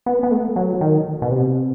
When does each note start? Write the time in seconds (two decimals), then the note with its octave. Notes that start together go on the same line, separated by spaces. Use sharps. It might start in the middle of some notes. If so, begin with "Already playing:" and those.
0.06 B3
0.23 B3
0.31 A3
0.56 F#3
0.81 D#3
1.22 B2
1.31 C3